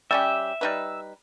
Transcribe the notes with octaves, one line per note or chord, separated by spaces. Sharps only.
G3 C#4 G4 E5
G3 D#4 B4